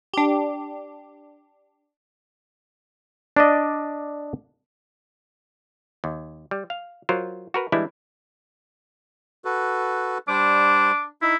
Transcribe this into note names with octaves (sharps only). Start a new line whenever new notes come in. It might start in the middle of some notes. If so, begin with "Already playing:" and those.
D4 G4
D4 D5 D#5
D#2
G3
F5
F#3 F4 A#4 C5
F#4 A#4 B4
E3 G3 G#3 D4 E4
F#4 A4 B4
G3 D4 C5 D6
D#4 E4